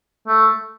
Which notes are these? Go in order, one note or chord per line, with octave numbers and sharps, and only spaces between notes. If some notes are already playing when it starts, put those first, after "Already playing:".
A3